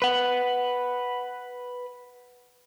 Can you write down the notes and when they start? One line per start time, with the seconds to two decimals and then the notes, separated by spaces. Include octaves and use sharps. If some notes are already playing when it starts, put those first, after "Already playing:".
0.02 B4 F#5